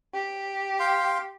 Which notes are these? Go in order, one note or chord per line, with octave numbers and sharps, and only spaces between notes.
G4
F5 G5 C6